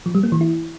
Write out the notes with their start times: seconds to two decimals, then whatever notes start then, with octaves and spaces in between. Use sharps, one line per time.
0.06 F3
0.15 G3
0.23 A#3
0.32 E3
0.41 E4